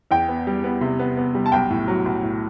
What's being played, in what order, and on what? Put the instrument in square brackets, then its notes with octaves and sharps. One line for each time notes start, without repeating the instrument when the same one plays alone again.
[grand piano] E2 G5
B3
G3
B3
C3
B3
B3
G3
A5
B1 G5
A2
F#3
B1
A2